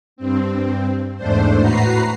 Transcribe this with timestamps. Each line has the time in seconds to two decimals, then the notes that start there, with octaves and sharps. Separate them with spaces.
0.16 G2 C4
1.16 E2 G#2 A3 D4 C5
1.59 A2 F#4 B4 A#5 C7